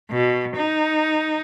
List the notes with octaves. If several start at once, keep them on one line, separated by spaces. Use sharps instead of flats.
B2
D#4